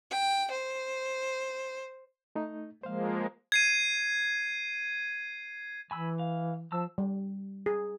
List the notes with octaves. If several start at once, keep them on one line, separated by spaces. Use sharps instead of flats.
G5
C5
A3 D#4
F3 G#3 A#3 C5 F5
G#6 C7 D#7
E3 G#5 B5 E6
F5
F3 A5 E6
G3
G#4